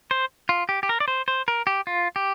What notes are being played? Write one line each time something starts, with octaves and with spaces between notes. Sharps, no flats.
C5
F4
G4
G4
A#4
D5
C5
C5
A#4
G4
F4
G4